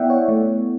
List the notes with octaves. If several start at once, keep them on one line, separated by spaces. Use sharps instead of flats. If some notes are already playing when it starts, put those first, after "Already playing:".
Already playing: B3 E4 D5 E5 F#5 G5
C#5
A3